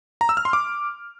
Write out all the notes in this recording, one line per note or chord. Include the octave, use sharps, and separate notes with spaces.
A#5
E6
F6
C6
D6